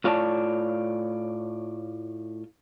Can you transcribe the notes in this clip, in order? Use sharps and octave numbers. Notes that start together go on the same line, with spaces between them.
A2 F4 C#5 D5 A5